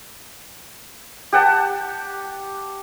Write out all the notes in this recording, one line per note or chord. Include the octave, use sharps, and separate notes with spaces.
G4 F#5 A5